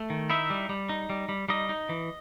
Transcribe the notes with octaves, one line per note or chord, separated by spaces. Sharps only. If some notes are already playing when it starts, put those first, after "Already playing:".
Already playing: A3
D#3
D#4 E4 E5
G3
G3
D#4
G3
G3
G3 D#4 D#5
D#4
E3